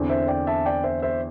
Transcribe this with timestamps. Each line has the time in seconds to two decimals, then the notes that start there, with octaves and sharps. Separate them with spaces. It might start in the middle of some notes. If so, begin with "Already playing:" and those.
Already playing: E2 D3 C4
0.09 C5 E5
0.28 D5 G5
0.47 E5 A5
0.66 D5 G5
0.84 C5 E5
1.02 C5 E5